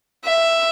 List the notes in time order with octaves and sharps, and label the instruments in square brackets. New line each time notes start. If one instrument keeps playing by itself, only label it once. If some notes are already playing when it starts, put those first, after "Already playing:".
[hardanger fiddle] E5